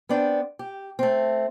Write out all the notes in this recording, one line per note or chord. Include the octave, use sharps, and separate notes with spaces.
B3 C4 D4 G5
G4
A3 C4